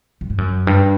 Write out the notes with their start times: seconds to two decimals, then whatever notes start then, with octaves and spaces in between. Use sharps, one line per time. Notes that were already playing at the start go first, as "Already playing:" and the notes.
0.21 F#2
0.30 G2
0.38 F#2
0.67 G2